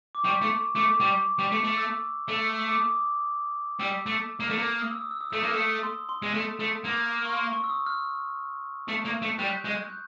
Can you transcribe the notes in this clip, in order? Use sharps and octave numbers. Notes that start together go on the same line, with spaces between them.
D6
G3 C#6
A3
A3 D6
G3
G3
A3
A3
E6
A3
D6
D#6
G3 E6
A3
A#3
A3
A#3
D#6
E6
D#6
E6
D#6
A3 E6
A#3 D#6
A3 E6
D#6
C6
C6
G#3
A3
A3
A#3
C#6
C6
C#6
E6
D#6
F6
A3
A#3
A3
G3 F#6
G6
F#6
G#3
F#6
G6